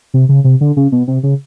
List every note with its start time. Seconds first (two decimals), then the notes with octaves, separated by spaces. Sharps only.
0.14 C3
0.29 C#3
0.44 C3
0.61 D3
0.77 C#3
0.92 B2
1.07 C3
1.23 C#3